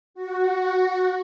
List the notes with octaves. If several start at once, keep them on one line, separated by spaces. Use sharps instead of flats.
F#4